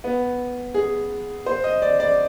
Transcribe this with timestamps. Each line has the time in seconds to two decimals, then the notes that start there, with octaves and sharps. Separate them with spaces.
0.04 B3
0.74 G#4
1.46 C5
1.64 D#5
1.82 D5
2.00 D5